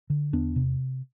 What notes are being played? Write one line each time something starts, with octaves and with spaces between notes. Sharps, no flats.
D3
E2 B3 D4
C3